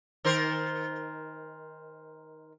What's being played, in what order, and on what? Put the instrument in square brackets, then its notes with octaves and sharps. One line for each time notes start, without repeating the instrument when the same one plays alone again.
[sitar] D#3 A#4 C5